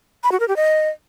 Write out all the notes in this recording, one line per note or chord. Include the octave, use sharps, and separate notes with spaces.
B5
F#4
A#4
G4
D#5